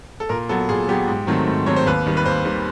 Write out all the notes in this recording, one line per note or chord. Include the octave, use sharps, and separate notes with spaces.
A4
A#2 A#4
F#3 B3 A4
A#2 G#4
F#3 B3 G4
G#2
D#3 F#3 A3 C4
G#2
D#3 F#3 A3 C4 C#5
C5
D#2 B4
D#3 G3
B4
D#2 C5
D#3 G3